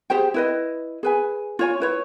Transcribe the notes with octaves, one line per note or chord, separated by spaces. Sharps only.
G4 G#4 C5 G5
E4 B4 D#5
G#4 B4 G#5
F4 C#5 G#5
E4 B4 C#5